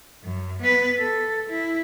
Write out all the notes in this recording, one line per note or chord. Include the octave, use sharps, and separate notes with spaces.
F#2
B3 B4
A4
E4